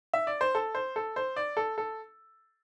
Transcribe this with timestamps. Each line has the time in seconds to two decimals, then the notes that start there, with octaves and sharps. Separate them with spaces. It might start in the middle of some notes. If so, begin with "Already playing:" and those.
0.13 E5
0.27 D5
0.41 C5
0.55 A4
0.75 C5
0.96 A4
1.16 C5
1.36 D5
1.57 A4
1.78 A4